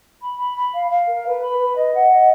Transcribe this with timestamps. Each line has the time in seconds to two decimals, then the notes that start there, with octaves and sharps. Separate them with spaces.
0.22 B5
0.39 B5
0.57 B5
0.73 F5
0.90 F5
1.08 A#4
1.25 B4
1.42 B5
1.59 B4
1.76 D#5
1.93 F#5
2.11 D#5